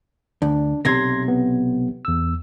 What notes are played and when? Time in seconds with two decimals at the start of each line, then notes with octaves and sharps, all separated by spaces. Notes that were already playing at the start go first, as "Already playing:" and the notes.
0.42 D2 D4
0.85 B1 C3 C6 G#6 A#6
1.28 B3
2.05 E2 E6